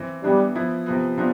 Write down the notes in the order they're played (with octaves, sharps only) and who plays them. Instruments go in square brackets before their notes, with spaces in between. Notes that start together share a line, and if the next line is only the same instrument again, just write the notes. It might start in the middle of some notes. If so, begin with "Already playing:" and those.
Already playing: [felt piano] E3 C4
[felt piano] E3 B3 D4 [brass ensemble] G3
[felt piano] F3 B3 E4
C3 F3 B3
C3 F3 B3 D4 F4